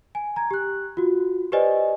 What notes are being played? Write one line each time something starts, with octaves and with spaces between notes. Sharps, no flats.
G#5
A#5 G#6
G4 F#6
F4 F#4
G4 B4 C5 D5 D#5 G#5